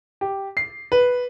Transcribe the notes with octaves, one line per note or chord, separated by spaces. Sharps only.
G4
C7
B4